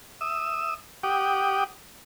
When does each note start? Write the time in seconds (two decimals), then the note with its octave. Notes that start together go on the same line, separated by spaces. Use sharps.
0.21 E5 D#6 E6
1.03 G4 F#5 G5 D6 D#6